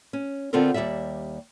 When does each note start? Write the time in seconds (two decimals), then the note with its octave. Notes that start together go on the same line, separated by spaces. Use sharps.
0.13 C#4
0.53 D3 B3 C4 F4 A4 A#4
0.74 D#2 G#2 G3 D5 E5